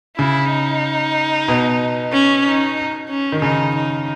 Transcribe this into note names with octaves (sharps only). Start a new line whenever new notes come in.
C#3 E4
D#4
B2
C#4
D#4
C#4
D#3
C#3 D#4
D#4